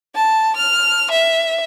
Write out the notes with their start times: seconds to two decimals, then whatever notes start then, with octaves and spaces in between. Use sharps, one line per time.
0.15 A5
0.56 F6
1.11 E5